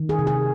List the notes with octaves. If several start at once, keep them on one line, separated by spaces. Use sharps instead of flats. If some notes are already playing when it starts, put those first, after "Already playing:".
Already playing: D#3
G#4
C3
G#4